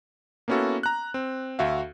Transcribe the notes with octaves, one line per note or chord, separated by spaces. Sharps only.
A#3 B3 C#4 E4 F#4 A4
A#5 F#6
C4
D2 F#4 E5 F5